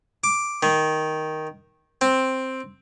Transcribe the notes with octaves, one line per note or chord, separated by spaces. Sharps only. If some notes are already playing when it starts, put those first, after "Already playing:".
D6
D#3
C4